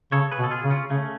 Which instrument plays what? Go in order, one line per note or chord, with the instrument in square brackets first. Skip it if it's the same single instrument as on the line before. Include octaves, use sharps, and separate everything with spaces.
[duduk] C#3 [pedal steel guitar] A4 C#5
[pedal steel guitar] G#4 B4
[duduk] B2
[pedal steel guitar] A4
F4 G#4
[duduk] C#3
[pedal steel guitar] C#4 F4
[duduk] C#3 [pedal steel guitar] A3 C#4